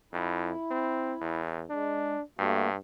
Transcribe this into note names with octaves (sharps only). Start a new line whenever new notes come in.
F2 E4
C4
E2
G#3 D4
G2 A3 A#3 F#4